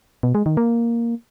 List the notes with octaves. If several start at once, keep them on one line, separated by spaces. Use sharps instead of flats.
B2
G#3
D#3
A#3